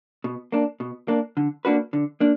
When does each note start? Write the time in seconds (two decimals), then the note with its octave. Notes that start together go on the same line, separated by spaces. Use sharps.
0.24 B2
0.52 A#3 D4
0.80 B2
1.08 A#3 D4
1.37 D3
1.65 A#3 D4 F#4 B4
1.93 D3
2.20 A#3 D4